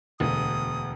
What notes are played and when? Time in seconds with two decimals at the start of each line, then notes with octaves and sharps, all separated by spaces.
0.20 E1 D2 D#6